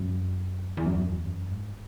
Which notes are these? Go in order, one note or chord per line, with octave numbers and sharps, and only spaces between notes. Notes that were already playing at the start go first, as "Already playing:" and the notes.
Already playing: F#2
E2
F#2
E2
F#2
E2
F#2
G#2